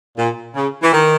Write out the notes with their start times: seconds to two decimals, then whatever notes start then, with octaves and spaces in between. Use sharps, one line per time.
0.18 A#2
0.55 C#3
0.83 E3
0.92 D#3